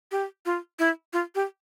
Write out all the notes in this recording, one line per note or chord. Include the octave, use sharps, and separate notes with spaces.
G4
F4
E4
F4
G4